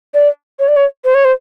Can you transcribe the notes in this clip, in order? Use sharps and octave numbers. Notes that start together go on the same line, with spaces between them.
D5
C#5
D5
C#5
C5
C#5
C5